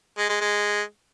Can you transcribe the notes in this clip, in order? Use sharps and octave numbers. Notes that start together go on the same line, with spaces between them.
G#3
G#3
G#3